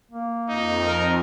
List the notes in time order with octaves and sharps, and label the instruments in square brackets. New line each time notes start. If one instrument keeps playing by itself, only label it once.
[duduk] A#3
[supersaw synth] F2 [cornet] D#4
[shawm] A#4